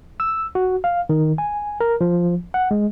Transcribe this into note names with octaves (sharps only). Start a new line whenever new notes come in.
E6
F#4
F5
D#3
G#5
A#4
F3
F#5
G#3